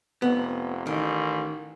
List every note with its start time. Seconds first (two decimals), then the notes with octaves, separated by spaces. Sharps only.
0.22 F1 B3
0.87 A1 D#3